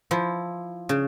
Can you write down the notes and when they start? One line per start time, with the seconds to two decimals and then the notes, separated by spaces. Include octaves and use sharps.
0.11 F3 E4
0.89 C#3